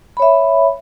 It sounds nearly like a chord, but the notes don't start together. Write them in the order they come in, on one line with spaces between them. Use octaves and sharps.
B5 C#5 E5